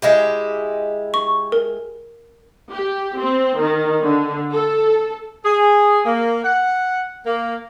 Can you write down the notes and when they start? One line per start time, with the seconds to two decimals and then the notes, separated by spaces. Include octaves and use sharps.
0.02 G#3 E4 G4
1.14 C#6
1.52 A#4
2.70 G4
3.18 C4
3.58 D#3
4.03 D3
4.54 A4
5.44 G#4
6.05 A#3
6.44 F#5
7.26 A#3